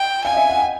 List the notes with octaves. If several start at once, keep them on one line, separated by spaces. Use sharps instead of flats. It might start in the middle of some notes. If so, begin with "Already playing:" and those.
Already playing: D#5 G5
F5 G#5
D#5
E5
F#5
G5